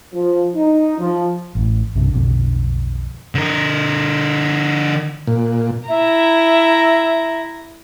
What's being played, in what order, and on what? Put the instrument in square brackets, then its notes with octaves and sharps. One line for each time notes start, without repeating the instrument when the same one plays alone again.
[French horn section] F3
D#4
F3
[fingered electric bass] A1 A2
B1 G2 C3 D4
B1 F2 B2 D3
[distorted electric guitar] D3 A#4
[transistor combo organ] A#2
[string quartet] E4 A#5 [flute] E5